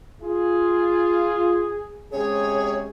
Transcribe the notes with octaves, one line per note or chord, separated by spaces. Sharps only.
F4 G#4
C3 G#3 C#4 G#4 C#5